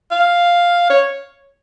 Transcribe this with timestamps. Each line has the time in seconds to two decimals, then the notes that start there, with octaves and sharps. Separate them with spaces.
0.11 F5
0.90 C#5